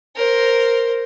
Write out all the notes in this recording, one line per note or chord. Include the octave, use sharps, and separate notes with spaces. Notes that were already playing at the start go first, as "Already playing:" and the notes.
A#4 C5